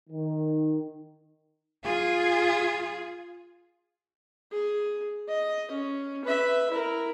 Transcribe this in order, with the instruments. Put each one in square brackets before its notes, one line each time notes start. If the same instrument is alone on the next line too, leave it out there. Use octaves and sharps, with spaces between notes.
[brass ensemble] D#3
[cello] F4 G#4
[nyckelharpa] G#4
D#5
C#4
B4 E5
E4 A#4